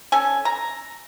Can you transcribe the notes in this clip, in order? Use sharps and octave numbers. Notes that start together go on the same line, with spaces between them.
C#4 A4 G#5
A#5